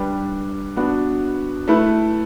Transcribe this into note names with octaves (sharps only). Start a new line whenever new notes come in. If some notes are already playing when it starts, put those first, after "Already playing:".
Already playing: G3 D4 G4 B4
B3 D4 F#4 B4
A3 E4 B4